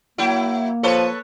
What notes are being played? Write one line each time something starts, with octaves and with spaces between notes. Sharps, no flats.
F#3 A#3 E4
F3 A4 B4 C#5